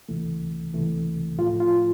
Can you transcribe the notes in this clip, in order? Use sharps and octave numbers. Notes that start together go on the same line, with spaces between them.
C#2 C3 E3 A3
C#2 C3 E3 A3
A2 F3 A3 F4
F4